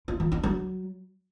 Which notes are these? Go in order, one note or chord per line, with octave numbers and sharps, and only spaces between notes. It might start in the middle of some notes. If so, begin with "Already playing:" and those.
F4
E3
D4
F#3